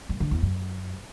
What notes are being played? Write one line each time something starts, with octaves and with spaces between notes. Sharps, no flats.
G2
D3
E2
F#2